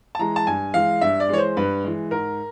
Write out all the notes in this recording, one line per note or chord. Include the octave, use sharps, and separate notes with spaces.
A5
E3 G#3 A#5
A5
G2 G#5
E3 G#3 F5
G2 E5
D5
E3 G#3 C#5
C5
G2 B4
E3 G#3
G#2 A#4